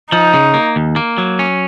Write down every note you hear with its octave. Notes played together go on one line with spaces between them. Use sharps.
F3 D#4
C#3
A#3
D#2
A#3
F#3
C#4